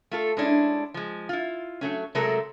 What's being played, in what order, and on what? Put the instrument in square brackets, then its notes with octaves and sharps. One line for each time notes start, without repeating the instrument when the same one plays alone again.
[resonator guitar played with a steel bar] A3 F4 A4
G#3 C#4 D4 E4
F3 G#3
E4 F4
F#3 A3 C#4
C3 F#3 G#3 A3 A4 A#4